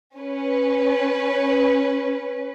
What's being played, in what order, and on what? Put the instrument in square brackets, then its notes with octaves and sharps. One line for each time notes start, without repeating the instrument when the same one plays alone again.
[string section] C#4 B4